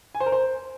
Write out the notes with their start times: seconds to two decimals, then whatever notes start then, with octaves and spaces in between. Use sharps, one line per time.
0.15 G#5
0.20 C5
0.26 A#4
0.32 C5